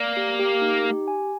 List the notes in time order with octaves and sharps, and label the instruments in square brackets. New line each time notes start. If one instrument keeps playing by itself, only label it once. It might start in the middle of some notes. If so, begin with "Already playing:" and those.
Already playing: [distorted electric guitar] A#3 [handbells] D5
[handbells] G4
G4
D#4
G4
G#5